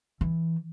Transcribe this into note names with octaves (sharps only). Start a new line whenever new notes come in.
E3